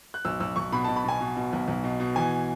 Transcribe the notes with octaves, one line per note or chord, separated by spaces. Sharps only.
F#6
B1 E6
B1 E6
B1 C#6
B2 B5
B2 A5
B5
B2 G#5
B2
B2
B1
B1
B2
B2
E3 G#5